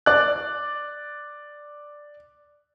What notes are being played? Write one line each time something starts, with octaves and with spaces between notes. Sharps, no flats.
D5 F#6